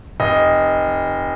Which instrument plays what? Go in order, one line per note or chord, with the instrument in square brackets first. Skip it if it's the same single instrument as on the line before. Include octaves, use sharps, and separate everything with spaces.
[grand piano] F1 D#5